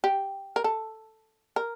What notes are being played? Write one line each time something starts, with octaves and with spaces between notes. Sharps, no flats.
G4
A#4
A4
A#4